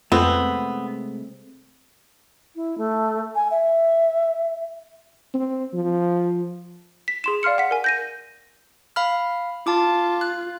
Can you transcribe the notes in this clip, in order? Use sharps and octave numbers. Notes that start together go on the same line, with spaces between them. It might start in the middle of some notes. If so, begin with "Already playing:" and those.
F2 C3 G#3 A3 B3 C4
E4
A3
G#5
E5
C4
F3
B6
G#4 C6 E7
D5 F5 C6 F6 C#7
F#5 B6
A#4 G#5
G6 A#6 D#7
F5 B5 F6
F4 A5 D6
F#6